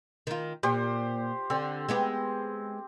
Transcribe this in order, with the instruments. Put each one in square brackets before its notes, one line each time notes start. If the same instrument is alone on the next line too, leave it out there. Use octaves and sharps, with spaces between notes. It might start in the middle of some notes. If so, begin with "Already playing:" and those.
[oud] D#3 F4
[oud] A#2 [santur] G4 C5
[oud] D3 [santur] C4
[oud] G#3 B3 G4